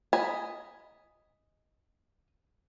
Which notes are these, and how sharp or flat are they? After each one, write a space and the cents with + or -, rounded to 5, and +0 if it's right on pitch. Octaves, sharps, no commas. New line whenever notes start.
D#5 +0 G#5 +0 B5 +0